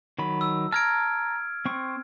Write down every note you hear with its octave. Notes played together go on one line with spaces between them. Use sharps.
D#3 F#3 B5
E6
A5 A#5 F6 G#6 D7
C4 C#6